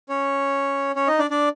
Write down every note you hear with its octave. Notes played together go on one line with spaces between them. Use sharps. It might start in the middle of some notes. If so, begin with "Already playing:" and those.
C#4 C#5
C#4 C#5
D#4 D#5
D4 D5
D4 D5